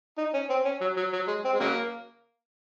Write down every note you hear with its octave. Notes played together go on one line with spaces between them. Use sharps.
D#4
C#4
C4
C#4
F#3
F#3
F#3
G#3
C4
G#3
C#3 F#3 A#3